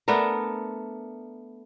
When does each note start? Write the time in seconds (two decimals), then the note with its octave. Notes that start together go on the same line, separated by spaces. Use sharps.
0.08 A3 B3 D4 A#4